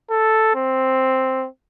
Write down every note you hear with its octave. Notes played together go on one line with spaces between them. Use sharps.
A4
C4